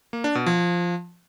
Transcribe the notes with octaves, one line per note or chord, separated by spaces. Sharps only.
A#3
D4
B2
F3